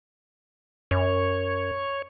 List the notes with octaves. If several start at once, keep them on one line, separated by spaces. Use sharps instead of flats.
F#2 C#5